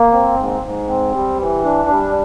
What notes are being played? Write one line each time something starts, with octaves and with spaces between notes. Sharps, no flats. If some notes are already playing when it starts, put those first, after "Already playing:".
Already playing: A#3
C4
G#2
G#2
C4
G3
E3
D4
G3